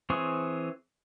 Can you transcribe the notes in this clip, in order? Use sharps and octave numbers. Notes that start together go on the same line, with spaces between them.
E3 C4 G#4 C#5